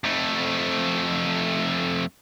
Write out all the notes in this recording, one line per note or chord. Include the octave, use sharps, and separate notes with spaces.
F2 A3